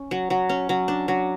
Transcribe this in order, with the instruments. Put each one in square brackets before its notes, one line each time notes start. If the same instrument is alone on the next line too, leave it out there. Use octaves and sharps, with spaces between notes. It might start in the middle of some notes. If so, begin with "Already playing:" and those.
Already playing: [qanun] C#4
F#3
F#3
C#4
F#3
D4
F#3